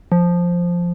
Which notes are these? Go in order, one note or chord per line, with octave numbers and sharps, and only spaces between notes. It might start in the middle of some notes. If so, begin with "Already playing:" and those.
F3